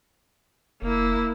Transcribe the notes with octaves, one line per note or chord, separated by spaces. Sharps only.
F1 A#3 E4